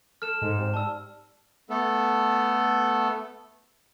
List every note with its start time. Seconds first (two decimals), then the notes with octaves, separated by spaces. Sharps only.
0.22 A4 F6 E7
0.42 G#2 G#3
0.58 C3
0.74 G3 A5 E6
1.70 A3 B3 A4